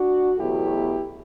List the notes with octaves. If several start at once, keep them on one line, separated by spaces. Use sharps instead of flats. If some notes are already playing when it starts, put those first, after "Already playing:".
Already playing: D4 F#4
E2 B2 F#3 A3 E4 G4